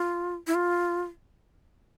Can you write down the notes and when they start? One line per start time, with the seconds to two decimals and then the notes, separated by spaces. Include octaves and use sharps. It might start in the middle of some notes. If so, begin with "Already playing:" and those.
Already playing: F4
0.47 E4
0.55 F4